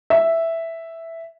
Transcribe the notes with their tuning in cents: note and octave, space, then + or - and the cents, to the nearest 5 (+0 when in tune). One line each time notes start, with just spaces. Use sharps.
E5 +0